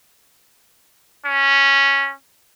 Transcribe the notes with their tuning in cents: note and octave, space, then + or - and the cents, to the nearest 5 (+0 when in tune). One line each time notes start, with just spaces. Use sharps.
C#4 -5